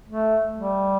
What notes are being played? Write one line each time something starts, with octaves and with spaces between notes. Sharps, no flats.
A3
G3